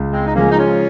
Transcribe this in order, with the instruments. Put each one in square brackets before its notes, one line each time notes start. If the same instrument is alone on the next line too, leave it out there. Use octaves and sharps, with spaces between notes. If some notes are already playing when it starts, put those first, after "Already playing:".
Already playing: [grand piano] C#2
[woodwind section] G#3 C4
D#4
[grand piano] C#3 F3 G#3 [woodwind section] A#3 C#4
[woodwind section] D#4
C#4 F4